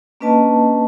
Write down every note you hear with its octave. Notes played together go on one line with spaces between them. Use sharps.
A#3 C#4 D4 B4 D#5 A5